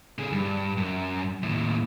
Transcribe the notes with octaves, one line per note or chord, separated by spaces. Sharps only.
D3 G#4
G2
F#2
D#2 A2